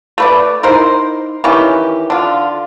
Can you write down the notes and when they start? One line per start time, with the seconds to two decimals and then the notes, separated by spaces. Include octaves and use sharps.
0.18 A3 B4 D5
0.63 D#4 E4 A#4 C5
1.44 D#3 E3 C#4 G4
2.10 D3 F4